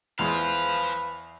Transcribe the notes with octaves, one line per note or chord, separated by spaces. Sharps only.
E2 G#3 B4 C5 F5